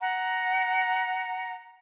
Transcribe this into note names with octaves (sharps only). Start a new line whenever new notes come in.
F#5 A#5